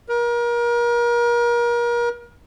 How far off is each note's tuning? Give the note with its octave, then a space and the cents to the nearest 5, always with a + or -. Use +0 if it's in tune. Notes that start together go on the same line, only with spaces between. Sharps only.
A#4 +35